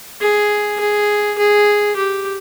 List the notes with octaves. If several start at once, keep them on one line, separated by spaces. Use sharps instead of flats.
G#4
G#4
G#4
G4